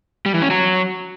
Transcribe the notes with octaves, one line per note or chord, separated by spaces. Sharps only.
G3
E3
C#4
F#3